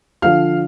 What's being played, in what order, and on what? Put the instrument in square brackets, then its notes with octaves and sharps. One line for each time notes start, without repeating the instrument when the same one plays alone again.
[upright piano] D3 F3 F5 F6